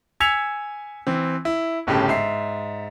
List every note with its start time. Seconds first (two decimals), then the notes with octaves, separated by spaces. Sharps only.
0.20 G#5 E6 G#6 B6 C#7 F7
1.07 E3 C4
1.45 E4
1.87 G1 A2 C#3 G4 A5
2.08 G#2 E5 C7